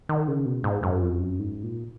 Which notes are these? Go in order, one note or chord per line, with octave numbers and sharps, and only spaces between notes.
D#3
C#3
B2
G#2
F#2
F2
F#2
G#2
A#2